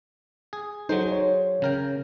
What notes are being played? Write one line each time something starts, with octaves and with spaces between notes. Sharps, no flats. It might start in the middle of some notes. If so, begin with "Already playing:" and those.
G#4
F#3 G#3 D#4 A4 C5
C#5
C#3 A#4 G5